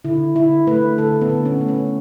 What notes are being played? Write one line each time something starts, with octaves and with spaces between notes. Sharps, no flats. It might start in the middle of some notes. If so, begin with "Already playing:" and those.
D3 E4
D3 E4
A3 B4
D3 A4
B3
D3
C#4
A3
C#4